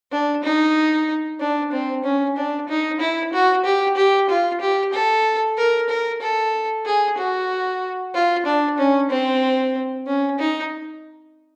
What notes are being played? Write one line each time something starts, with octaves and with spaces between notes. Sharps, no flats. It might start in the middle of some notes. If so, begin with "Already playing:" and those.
D4
D#4
D4
C4
C#4
D4
D#4
E4
F#4
G4
G4
F4
G4
A4
A#4
A#4
A4
G#4
F#4
F4
D4
C#4
C4
C#4
D#4